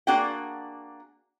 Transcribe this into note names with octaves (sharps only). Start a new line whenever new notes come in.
A#3 D4 F#4 G#4 F#5 G5